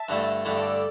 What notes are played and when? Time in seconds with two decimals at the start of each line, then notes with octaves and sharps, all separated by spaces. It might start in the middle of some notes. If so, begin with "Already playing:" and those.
Already playing: E5 A5
0.09 G2 D3 A3 E4
0.44 G2 D3 A3 E4 A4 D5